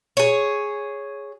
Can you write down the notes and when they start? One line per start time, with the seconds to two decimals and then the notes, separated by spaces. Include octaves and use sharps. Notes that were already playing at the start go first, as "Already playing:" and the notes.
0.17 G#4 C#5